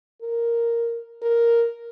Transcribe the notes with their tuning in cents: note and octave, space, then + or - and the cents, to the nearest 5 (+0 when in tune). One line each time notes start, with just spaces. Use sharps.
A#4 +0
A#4 +0